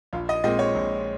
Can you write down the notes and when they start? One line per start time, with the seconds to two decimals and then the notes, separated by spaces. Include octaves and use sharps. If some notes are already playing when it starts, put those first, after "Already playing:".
0.13 A#1 F4
0.29 D#5
0.44 A#2 G#3 C4 D#5
0.59 C#5
0.75 A#1